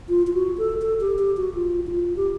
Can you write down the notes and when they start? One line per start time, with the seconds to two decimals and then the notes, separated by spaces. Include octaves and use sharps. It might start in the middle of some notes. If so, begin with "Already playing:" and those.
0.09 F4
0.27 F4
0.34 F#4
0.58 A4
0.82 A4
1.01 G4
1.19 G4
1.37 F#4
1.54 F4
1.87 E4
1.91 F4
2.16 G4